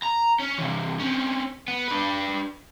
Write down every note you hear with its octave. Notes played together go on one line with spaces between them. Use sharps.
A#5
C#4
C3 E3
C4 C#4
B3
D4 B4